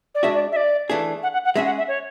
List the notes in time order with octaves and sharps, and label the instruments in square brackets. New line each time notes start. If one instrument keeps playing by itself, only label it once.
[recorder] D5
[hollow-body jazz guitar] G#3 D4 F#4 [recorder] E5
[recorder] D5
E5
D5
[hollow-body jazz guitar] E3 A3 D4 G#4
[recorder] F#5
F#5
F#5
[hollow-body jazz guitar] G#3 C#4 G#4 [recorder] E5
[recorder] F#5
E5
C#5